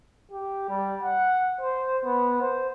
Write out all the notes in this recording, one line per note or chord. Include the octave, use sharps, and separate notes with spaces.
G4
G3
F#5
C5
B3
C5